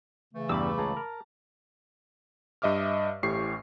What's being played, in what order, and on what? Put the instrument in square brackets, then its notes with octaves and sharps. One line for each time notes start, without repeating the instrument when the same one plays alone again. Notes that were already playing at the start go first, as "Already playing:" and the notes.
[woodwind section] C#3 E3 A3
[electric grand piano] E2 G2 [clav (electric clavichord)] G3 [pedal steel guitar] B5 D6 E6
[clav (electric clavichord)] C#2 G#4 C#5 [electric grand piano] A5 A#5
[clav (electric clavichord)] A#4
[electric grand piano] G2 D#5 E5 D6 F6
A1 A2 G4 C#6 C7